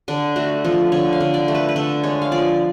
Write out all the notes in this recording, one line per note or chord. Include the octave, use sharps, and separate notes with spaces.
D3 D4
A3 F#4
F3 A4
D3 C#5
F5
D3
D5
A3
B4
B4
D3 A4
G#3 C#5
F5
F3 D5